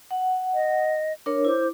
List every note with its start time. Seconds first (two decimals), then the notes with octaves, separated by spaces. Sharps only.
0.11 F#5
0.54 D#5
1.26 D4 A#4 C#5
1.45 E4 C5 D6